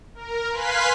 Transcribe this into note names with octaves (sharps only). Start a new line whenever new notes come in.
A#4
B4 F5 G#5 C6 F#6 B6